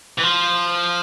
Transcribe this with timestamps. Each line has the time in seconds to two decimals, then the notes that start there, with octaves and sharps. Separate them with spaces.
0.18 E3
0.23 F3